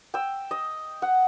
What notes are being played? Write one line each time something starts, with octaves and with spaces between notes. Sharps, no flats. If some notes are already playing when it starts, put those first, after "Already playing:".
G5 E6
D#5
F#5